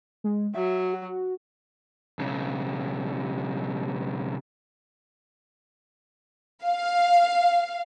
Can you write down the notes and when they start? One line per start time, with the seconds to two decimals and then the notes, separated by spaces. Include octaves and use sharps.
0.24 G#3
0.55 F#3 E5
0.93 F#4
2.19 B1 C#3
6.65 F5